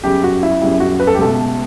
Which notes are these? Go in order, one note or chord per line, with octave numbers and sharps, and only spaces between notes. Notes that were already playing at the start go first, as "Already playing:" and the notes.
F#2 C#3 G3 G4
F#4
E4
F#2 C#3 G3 E4
F#4
B4
A4
G4
C#2 B2 A3 A4